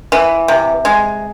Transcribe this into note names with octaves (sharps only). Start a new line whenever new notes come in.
E3
C3
G#3